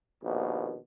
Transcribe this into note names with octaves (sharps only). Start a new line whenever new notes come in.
A#1 D#2 B2